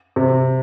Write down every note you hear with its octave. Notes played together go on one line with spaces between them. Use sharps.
C3